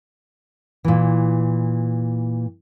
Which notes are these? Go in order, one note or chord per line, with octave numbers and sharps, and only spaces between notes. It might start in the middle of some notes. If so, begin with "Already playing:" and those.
A#2 E3